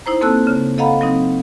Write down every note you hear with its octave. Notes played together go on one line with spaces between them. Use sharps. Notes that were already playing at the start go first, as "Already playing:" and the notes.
D#4 E4 C5 A#5
A#3 C4 A4 A5 E6 F#6
C#3
A4 D#5 F5 F#5 A#5 B5
F#3 C4 D#4